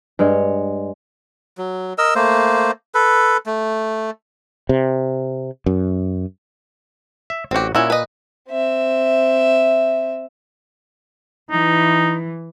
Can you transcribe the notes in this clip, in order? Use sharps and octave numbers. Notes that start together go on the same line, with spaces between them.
G2 G#3 C#5
F#3
A#4 D#5 E6
A3 A#3 C5
A4 B4
A3
C3
F#2
E5
A1 C4 F#4 G4
A#2 C#4 E4 F#4
B4 D#5
C4 E5
E3 D#4